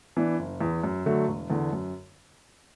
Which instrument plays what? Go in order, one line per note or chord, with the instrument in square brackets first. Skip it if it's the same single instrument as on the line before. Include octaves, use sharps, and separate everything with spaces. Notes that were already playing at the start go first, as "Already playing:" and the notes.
[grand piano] E3 B3 D4
F#1
E2 E3
F#2
D3 F#3 A3
E1
E2 D3
F#2